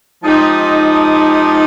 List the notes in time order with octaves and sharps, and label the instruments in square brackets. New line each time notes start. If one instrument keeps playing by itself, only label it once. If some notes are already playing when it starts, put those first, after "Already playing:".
[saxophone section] F3 G#3 D#4 G4